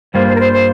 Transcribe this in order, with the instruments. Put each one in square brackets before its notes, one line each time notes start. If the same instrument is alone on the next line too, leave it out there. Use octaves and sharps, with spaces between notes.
[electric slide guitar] G2 G3 A#3 F4 [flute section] C5
[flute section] C5
A#4
C5
C5